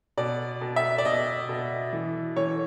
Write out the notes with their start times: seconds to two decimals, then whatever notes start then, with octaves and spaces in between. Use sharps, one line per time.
0.17 B2 D5
0.61 B2
0.76 E5
0.98 D5
1.05 B2 D#5
1.49 B2
1.93 E3
2.36 E3 C#5